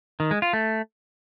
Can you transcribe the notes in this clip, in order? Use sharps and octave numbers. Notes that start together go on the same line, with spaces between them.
D#3
G#3
F4
A3